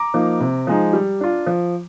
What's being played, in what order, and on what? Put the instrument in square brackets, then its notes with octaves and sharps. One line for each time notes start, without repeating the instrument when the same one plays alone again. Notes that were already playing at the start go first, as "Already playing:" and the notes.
Already playing: [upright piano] A#5 D6
F3 A#3 D#4
C3
F3 G#3 D#4
G3
D4 F4
F3